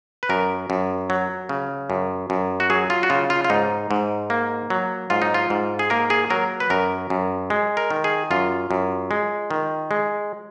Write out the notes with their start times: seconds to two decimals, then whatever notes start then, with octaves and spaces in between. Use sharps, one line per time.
0.23 B4
0.29 F#2 A#4
0.70 F#2
1.10 F#3
1.49 C#3
1.90 F#2
2.30 F#2
2.60 F#4
2.70 F#3 G#4
2.90 F4
3.03 F#4
3.10 C#3 F4
3.30 F4
3.45 F4
3.50 G#2 D#4
3.91 G#2
4.30 A#3
4.70 F#3
5.10 G#2 F4
5.22 D#4
5.34 F4
5.50 G#2
5.79 G#4
5.90 A#3 A#4
6.10 G#4
6.30 F#3 A#4
6.60 B4
6.70 F#2 A#4
7.10 F#2
7.50 G#3
7.77 A#4
7.91 D#3
8.04 G#4
8.31 F#2 F4
8.71 F#2
9.11 G#3
9.51 D#3
9.91 G#3